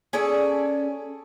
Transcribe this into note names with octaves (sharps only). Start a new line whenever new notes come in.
C#4 G#4 A4 D5